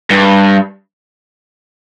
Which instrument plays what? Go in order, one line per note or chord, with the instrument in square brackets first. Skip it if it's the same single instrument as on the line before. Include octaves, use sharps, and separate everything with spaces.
[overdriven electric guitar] G2